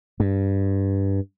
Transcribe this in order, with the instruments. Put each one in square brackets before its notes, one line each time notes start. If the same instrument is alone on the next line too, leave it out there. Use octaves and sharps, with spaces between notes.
[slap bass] G2